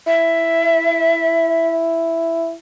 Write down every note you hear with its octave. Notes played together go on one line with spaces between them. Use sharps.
E4 E5